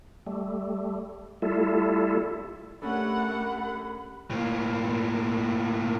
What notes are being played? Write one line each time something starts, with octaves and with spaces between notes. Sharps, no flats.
G3 A3
G3 A3 E4 F4 A4
A3 C#4 D4 G4 A4 A#4 F#5 B5
A2 A#3